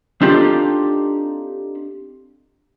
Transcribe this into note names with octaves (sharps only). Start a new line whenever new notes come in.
C4 D4 D#4 F4 G4 A4